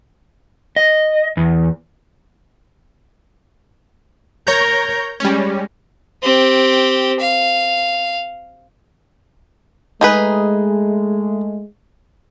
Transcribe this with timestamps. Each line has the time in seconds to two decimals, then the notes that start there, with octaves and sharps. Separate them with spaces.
0.76 D#5
1.37 E2
4.47 A#4 C#5 A#5 G6
5.20 G3 G#3 C#4
6.23 C4 G4
7.20 F5
10.01 G#3 A3 D#4 G#4 B4